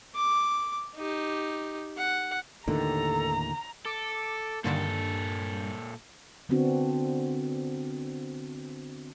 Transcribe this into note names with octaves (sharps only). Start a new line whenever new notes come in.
D6
D#4 G4
F#5
D#2 A2 D3 D#3 A4 A#5
A4 D6
G2 A#2 D3 D#3 A#3 A4
D3 B3 C4 D4 F#4